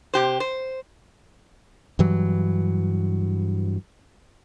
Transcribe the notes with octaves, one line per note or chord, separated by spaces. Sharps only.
C3 G4 C5
C5
G2 E3 F#3